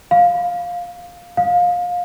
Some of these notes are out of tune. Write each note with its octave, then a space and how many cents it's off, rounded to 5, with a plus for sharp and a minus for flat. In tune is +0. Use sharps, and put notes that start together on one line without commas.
F5 +10
F5 +25